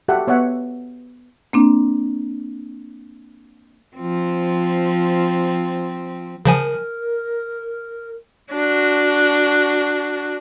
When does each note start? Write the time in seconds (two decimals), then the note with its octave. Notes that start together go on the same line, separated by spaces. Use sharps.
0.08 F#4 G4 A4 E5 F#5
0.27 B3 C#5 E5 F#5
1.53 A#3 C4 D4
3.97 F3 C4
6.46 C#3 F3 A#4 G#5
8.51 D4 F#4